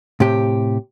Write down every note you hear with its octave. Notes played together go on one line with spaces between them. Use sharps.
A2 C3 G4